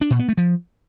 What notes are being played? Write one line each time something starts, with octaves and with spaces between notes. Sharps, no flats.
D4
A#2
B3
A3
F3